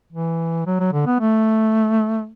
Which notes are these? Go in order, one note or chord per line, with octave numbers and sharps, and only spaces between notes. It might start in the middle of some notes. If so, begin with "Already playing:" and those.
E3
F#3
F#3
D3
B3
A3